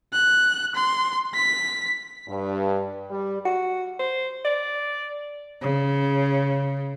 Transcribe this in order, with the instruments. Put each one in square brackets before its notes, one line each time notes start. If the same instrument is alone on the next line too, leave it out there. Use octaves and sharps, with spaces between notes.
[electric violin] F#6
C6
B6
[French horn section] G2
G3
[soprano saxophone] F#4
C5
D5
[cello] C#3